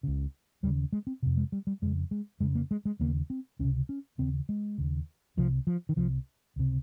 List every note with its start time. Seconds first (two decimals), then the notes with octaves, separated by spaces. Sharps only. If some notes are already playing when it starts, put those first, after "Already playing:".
0.03 C#2 C#3
0.63 D#2 G3
0.67 C#3
0.92 G#3
1.07 C4
1.22 F2 C3
1.37 G#3
1.52 G3
1.67 G3
1.82 F2 C#3 G#3
2.11 G#3
2.40 F2 C#3 G#3
2.55 A#3
2.71 G#3
2.85 G#3
2.99 D#2 C#3 A#3
3.30 C4
3.59 C#2 C3 C#4
3.89 C#4
4.18 D#2 C#3 C4
4.49 G#3
4.78 D#2 C#3
5.37 C2 C3 F3
5.67 F3
5.89 D#3
5.96 C2 C3 F3
6.56 C#2 C3